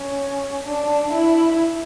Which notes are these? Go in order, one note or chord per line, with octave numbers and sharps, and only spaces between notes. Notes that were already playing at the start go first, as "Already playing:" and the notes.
Already playing: C#4
D4
E4